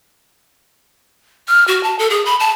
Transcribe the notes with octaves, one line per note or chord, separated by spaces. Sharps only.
F6
F#4
A5
A4
G#4
B5
A5